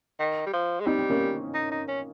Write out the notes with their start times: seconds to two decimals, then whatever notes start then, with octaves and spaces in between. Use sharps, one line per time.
0.19 D#3
0.46 G3
0.53 F3
0.80 G#3
0.86 G3 C4 D#4
0.99 C4
1.10 A#3 C#4
1.54 D#4
1.71 D#4
1.88 C#4